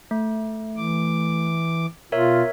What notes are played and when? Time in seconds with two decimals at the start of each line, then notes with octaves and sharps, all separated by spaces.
0.11 A3
0.77 E3 D6
2.12 B2 F4 A#4 C#5 E5